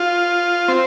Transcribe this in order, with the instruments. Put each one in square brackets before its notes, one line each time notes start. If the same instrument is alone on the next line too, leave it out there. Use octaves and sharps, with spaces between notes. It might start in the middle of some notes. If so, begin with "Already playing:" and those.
Already playing: [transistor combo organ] F4
C4